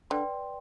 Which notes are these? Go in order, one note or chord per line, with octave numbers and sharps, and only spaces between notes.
D3 B4 D5 G5 C6